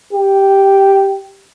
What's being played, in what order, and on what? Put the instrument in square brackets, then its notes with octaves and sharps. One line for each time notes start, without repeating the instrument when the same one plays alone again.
[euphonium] G4